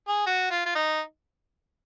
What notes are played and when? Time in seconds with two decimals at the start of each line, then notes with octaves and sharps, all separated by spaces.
0.08 G#4
0.27 F#4
0.51 F4
0.66 F4
0.75 D#4